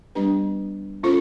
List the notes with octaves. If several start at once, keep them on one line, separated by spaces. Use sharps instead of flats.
G3 B3 D4 G4 B4
C#4 F4 A4 C5